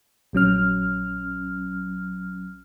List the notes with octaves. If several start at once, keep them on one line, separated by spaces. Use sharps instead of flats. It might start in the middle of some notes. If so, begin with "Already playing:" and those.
A#1 F#3 C#4 F6